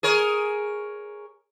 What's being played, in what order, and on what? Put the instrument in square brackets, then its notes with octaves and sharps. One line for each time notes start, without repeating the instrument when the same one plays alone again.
[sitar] G#4 A#4 C#5